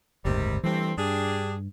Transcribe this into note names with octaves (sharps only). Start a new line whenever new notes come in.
F#1 D2 G#2 C3 D#3 G3
G2 E3 G3 A3 C4
G2 D4 G4 G#4